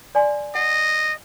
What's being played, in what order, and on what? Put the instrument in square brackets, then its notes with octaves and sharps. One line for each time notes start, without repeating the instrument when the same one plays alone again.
[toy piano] D5 G#5 C6
[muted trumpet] D#5 [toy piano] F#5